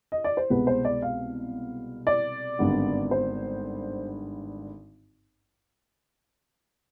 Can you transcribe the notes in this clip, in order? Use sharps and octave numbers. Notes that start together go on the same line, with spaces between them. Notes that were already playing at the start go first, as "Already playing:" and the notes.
D#5
D5
C5
C2 B2 G#3 B3 B4
C5
D5
F5
D5
G#1 G2 D3 G3 B3
C5